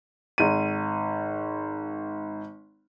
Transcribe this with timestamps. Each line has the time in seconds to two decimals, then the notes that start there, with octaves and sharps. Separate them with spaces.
0.38 G#1 D#7